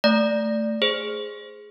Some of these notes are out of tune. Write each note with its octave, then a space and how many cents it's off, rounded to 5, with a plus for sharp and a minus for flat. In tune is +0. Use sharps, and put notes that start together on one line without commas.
A3 +10 D5 +0
G#4 +0 C5 +0